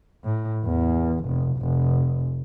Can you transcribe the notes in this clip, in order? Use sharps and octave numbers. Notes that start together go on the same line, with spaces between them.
A2
E2
F1
F1